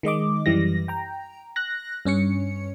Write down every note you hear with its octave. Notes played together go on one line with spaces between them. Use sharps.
D#3 G#3 D#5 D6
F#2 E3 G3 A#6
G5 A#5
F#6 A#6
G2 C#4 C#5 C#7